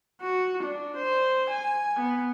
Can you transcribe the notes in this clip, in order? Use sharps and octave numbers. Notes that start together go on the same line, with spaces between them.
F#4
D4
C5
G#5
B3